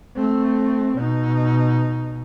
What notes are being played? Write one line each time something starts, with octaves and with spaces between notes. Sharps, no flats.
A3 C4
B2 D#4